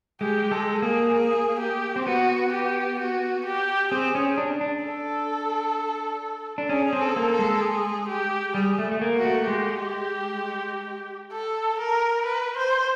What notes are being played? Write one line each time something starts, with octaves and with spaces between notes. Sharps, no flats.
G#3 G4
G#3 A4
A#3 G#4
G#4
G4
C4
B3 F#4
G4
F#4
G4
C4 G#4
C#4
D4
D4
A4
D4
C#4 G#4
C4
A4
A#3
A4
G#3
G#4
G4
G3 G#4
A3
A3
A#3
F#4
A3
G#3 G4
A4
A#4
B4
C5